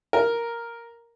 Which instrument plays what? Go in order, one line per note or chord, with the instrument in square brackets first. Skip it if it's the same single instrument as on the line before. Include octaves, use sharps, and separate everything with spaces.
[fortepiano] A#4